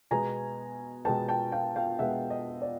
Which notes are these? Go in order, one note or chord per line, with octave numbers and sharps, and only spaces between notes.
B2 G#3 B3 G#5 A#5
B2 G#3 B3 G5 A5
G5 A5
F5 G5
F5 G5
B2 G#3 B3 E5 F#5
D#5
D5